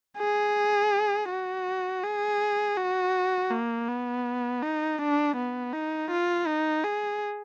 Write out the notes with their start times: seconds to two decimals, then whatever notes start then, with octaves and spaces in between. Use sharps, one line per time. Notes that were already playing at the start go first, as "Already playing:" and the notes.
0.18 G#4
1.30 F#4
2.04 G#4
2.77 F#4
3.51 A#3
3.89 B3
4.63 D#4
4.99 D4
5.37 B3
5.74 D#4
6.11 F4
6.47 D#4
6.84 G#4